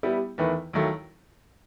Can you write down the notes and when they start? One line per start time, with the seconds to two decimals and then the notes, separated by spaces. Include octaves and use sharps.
0.03 G3 B3 E4 G4
0.38 E2 D#3 A3 E4 B4
0.73 D#2 D#3 F#3 A3 E4